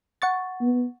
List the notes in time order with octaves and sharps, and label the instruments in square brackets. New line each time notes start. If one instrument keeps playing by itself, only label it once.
[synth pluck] F#5 C#6 A6
[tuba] B3